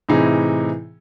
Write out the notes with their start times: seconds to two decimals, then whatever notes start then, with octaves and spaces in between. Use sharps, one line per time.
0.09 A2 C3 E3 D#4 E4 G#4